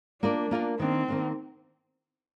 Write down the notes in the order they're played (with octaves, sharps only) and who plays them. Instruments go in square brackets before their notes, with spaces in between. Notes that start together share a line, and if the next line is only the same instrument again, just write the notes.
[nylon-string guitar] A#3 F4 A#4 D5 [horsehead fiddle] D4
[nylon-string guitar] A#3 F4 A#4 D5
[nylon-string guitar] D#3 A#3 D4 [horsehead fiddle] C4
[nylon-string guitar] D#3 A#3 D4